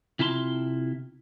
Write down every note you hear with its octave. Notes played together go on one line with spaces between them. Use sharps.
C3 E4 F4 A5 A#5 C6